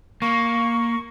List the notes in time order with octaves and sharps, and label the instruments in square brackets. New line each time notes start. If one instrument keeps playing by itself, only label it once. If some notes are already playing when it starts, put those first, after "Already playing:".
[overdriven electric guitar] A#3 [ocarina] C#6